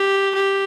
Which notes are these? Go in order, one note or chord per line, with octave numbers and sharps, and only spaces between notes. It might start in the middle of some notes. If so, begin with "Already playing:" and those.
Already playing: G4
G4